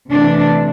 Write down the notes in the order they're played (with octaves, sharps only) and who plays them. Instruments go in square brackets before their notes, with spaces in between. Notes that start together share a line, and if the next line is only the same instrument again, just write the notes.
[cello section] C3 E3 A3 D4